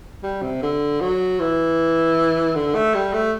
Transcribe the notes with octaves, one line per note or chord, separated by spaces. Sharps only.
G3
C3
D3
F#3
E3
D3
A3
G3
A3